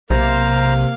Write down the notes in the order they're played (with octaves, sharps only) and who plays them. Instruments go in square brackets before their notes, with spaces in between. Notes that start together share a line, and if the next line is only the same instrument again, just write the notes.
[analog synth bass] B1 [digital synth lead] C3 [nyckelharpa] A#3 F5 [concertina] C5 A#5